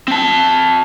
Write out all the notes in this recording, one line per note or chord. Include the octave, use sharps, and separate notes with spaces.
C4 A5